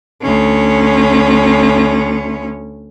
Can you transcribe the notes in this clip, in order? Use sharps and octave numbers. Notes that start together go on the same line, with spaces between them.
D2 C#4